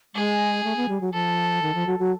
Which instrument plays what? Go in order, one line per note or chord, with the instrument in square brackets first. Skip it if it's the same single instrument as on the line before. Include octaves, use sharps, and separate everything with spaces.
[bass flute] G#3 [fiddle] G#4
[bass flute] A3
B3
G3
F#3
[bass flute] F3 [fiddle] A4
[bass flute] D#3
F3
F#3
F#3